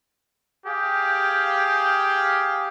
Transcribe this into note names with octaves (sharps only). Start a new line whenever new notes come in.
G4 G#4 F5 G5